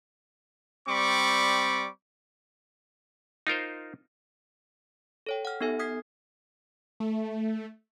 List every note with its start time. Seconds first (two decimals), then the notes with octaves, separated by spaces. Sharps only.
0.88 G3 C4 D5 B5 C#6 D6
3.47 D#4 F4 A#4 C5
5.27 A4 C#5 G5
5.45 F#5 F6
5.61 B3 D#4 G4 A4 E5 G#5
5.79 D#6 F6 G#6 B6 C7
7.00 A3